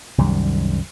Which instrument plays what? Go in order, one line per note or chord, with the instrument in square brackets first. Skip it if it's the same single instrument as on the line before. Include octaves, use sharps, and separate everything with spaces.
[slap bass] C2 F#2 D#3 G3